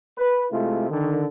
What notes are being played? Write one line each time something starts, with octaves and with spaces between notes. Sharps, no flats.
B4
C3 G#3 A3 E4 F4
D3 D#3